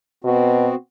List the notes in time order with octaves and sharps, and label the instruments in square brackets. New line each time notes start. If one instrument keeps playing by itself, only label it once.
[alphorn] B2 [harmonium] B3 C4 F#4